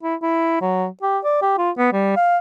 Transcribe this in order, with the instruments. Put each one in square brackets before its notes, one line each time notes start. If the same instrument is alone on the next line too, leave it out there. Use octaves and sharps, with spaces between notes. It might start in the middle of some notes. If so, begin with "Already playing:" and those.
[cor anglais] E4
E4
F#3
G4
D5
G4
F4
B3
G3
F5